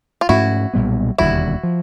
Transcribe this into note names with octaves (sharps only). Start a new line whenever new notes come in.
F4
G#2 F3 A3 C#4 E4 F#4
B1 A#2 G3 B3
E1 D#2 D3 G3 E4 F#4
F3